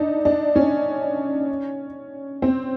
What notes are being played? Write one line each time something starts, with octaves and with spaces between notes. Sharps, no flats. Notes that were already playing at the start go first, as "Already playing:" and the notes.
Already playing: D4 D#4
D4
C#4
C4